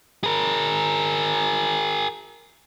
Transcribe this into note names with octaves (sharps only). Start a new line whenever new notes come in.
G#4 A#4